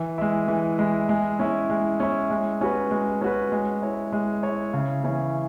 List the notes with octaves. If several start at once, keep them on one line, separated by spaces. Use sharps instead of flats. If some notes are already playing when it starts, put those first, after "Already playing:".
Already playing: E3
G#3 E4
E3
G#3 E4
G#3
C#4 E4
G#3
C#4 E4
G#3
C#4 F#4 B4
G#3
C#4 F#4 B4
G#3
E4 C#5
G#3
E4 C#5
C#3
E3 C#4 E4